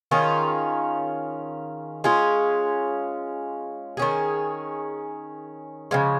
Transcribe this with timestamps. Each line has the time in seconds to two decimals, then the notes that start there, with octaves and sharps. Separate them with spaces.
0.11 D#3 C#4 F4 G#4
2.04 G#3 C#4 F4 G#4
3.97 D#3 C#4 G#4
5.91 C#3 F3 G#3